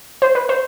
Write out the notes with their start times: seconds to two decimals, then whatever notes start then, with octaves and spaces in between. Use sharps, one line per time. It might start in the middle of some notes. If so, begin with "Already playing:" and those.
0.22 C5
0.35 B4
0.49 C5